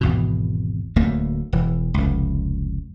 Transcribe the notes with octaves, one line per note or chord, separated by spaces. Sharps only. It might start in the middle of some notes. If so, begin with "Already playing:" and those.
G#1 E2 B2
D1 D2 A3 A#3
E1 E3
F1 C#2